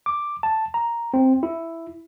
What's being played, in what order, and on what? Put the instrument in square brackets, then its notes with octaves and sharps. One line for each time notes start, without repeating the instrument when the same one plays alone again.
[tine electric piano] D6
A5
A#5
C4
E4